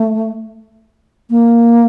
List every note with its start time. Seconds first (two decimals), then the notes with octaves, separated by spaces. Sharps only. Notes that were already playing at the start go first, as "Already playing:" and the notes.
Already playing: A3
1.30 A#3